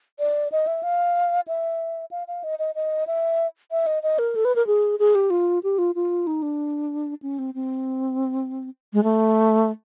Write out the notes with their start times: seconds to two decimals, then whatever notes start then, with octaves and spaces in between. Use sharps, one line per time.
0.19 D5
0.52 D#5
0.67 E5
0.83 F5
1.48 E5
2.11 F5
2.28 F5
2.44 D#5
2.59 D#5
2.75 D#5
3.07 E5
3.71 E5
3.87 D#5
4.03 D#5
4.19 A#4
4.35 A4
4.45 B4
4.56 A#4
4.67 G#4
4.99 G#4
5.15 G4
5.30 F4
5.63 G4
5.78 F4
5.95 F4
6.27 D#4
6.42 D4
7.22 C#4
7.39 C4
7.54 C4
8.93 G#3
9.04 A3